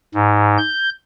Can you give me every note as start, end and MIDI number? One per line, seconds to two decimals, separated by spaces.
0.14 0.57 44
0.58 0.90 91